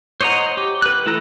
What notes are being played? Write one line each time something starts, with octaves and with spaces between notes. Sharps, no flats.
C5 C#5 D#5 F#5 A#5
G4
B4 F#6
E3 A3 E4 A4 A#5